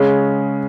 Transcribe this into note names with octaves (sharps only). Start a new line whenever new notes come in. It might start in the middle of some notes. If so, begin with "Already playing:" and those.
Already playing: C#3 G#3 C#4